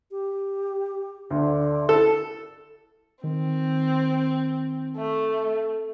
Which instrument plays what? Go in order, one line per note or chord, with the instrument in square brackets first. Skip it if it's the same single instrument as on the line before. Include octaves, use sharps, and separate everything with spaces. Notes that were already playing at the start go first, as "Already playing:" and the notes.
[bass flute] G4
[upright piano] D2 [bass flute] D3
[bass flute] E4 [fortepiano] A4
[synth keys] D#3 [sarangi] C4
[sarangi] A3